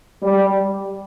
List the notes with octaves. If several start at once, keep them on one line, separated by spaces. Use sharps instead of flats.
G3